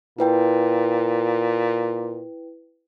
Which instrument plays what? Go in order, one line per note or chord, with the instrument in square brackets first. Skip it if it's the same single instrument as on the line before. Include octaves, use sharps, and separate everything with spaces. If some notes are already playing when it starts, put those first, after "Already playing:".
[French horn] A#2 [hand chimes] E4 B4 G5